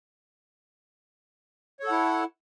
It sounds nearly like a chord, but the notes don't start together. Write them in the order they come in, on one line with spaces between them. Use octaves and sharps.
C#5 A4 F#5 E4